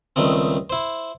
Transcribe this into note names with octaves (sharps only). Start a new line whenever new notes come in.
C#2 D#3 G3 A3 C4
E4 C5